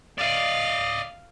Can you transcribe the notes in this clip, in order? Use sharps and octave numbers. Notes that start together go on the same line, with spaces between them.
D5 D#5 F5